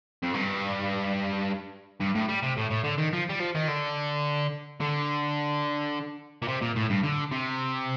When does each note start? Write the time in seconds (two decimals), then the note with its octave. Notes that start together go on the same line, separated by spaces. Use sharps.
0.23 F2
0.34 G2
2.00 G2
2.15 A2
2.29 G3
2.43 C3
2.57 A2
2.70 A2
2.84 D3
2.98 D#3
3.13 F3
3.30 G3
3.40 F3
3.55 D#3
3.68 D3
4.81 D3
6.42 A#2
6.48 C3
6.61 A#2
6.76 A2
6.90 G2
7.04 D3
7.32 C3